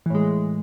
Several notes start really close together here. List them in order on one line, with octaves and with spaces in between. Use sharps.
E3 A2 G#3